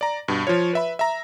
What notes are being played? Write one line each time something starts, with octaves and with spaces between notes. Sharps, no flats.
D5 A#5
G2 B2
F3 F4 C#5
B4 E5 B5
E5 A#5